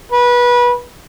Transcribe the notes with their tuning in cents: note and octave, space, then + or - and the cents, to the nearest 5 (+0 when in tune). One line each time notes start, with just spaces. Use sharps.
B4 -25